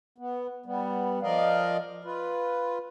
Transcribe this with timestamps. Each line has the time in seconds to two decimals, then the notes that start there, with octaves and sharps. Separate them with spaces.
0.18 B3
0.66 G3 B3
1.22 F3 A#4 D5 D#5 F5
2.04 F4 B4